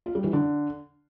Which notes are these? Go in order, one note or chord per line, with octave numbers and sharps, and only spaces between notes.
F4
G3
E3
D3